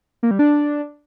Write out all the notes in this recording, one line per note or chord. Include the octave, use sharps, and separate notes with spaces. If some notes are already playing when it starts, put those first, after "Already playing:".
A#3
G3
D4